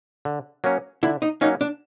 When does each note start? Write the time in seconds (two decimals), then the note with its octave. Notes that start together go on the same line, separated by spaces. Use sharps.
0.25 D3
0.64 F#3 A#3 C#4
1.03 D3 E4
1.22 D#4
1.41 F#3 A#3 C#4 D#4
1.61 D4